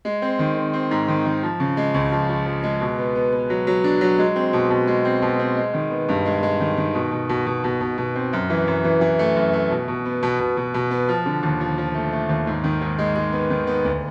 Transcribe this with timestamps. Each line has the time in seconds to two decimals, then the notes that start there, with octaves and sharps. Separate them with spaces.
0.05 G#3
0.22 C4
0.39 D#3
0.57 C4
0.74 C4
0.91 G#2
1.08 D#3
1.26 D#3
1.43 F3
1.60 C#3
1.77 G#3
1.94 C#2
2.12 F3
2.29 F3
2.46 F3
2.63 G#3
2.81 B2
2.98 B3
3.15 B3
3.33 B3
3.50 F#3
3.67 F#3
3.84 D4
4.01 F#3
4.19 G#3
4.36 C4
4.53 B2
4.70 B2
4.87 G#3
5.05 C4
5.22 B2
5.39 C4
5.57 G#3
5.74 D#3
5.91 B3
6.09 G2
6.26 G#3
6.43 G#3
6.60 D#3
6.77 D#3
6.95 B2
7.12 B2
7.29 B2
7.47 B2
7.64 B2
7.81 B2
7.98 B2
8.15 C4
8.33 F#2
8.50 E3
8.67 F#2
8.84 E3
9.01 E3
9.19 A3
9.36 F#2
9.53 A3
9.71 B2
9.88 B2
10.05 B3
10.23 B2
10.39 B2
10.57 B2
10.74 B2
10.91 B3
11.08 F3
11.26 D3
11.43 D#2
11.60 F3
11.78 F3
11.95 A3
12.12 A3
12.29 D#2
12.47 G#2
12.64 D#3
12.81 G#2
12.98 G#3
13.16 G#3
13.32 B3
13.50 D#3
13.67 B3
13.85 D2